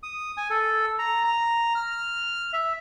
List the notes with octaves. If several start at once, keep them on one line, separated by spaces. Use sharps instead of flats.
D#6
G#5
A4
A#5
A#5
F6
E5